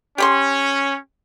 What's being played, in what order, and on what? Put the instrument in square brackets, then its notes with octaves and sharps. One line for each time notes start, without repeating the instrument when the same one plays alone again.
[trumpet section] C#4 [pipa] G4 B5 C6